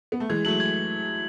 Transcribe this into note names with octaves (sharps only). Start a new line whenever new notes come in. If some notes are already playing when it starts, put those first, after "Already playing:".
B3
A3
E3 G#3 G#6
F#3 A3 F#7
G#6